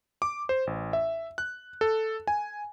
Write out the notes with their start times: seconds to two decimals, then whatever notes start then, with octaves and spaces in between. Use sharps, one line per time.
0.22 D6
0.49 C5
0.67 A1
0.93 E5
1.38 F#6
1.81 A4
2.27 G#5